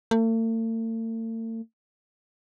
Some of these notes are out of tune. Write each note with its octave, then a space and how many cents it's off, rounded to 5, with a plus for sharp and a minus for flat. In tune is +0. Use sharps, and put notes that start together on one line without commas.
A3 +45